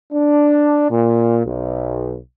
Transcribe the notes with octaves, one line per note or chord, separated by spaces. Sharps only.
D4
A#2
B1